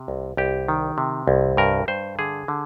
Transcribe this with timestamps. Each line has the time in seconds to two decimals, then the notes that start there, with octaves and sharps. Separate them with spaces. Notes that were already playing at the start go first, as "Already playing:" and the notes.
Already playing: C3
0.08 C2
0.37 C2 G4
0.68 D#3
0.98 C3
1.28 C2
1.57 G2 A#4
1.88 G2 C5
2.19 D3 G#4
2.48 D3